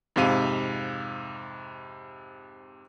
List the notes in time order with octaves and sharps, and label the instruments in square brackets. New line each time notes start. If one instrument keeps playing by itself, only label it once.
[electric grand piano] F2 G#2 C3 F5 D#7